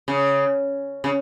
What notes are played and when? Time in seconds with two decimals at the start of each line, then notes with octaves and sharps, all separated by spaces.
0.08 C#3
1.04 C#3